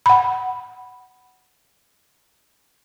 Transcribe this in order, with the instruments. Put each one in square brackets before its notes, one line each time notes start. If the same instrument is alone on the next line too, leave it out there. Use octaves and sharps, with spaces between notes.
[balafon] F#5 B5